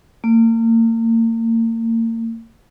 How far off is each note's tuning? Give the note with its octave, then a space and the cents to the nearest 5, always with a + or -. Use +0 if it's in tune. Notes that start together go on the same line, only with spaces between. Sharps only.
A#3 -40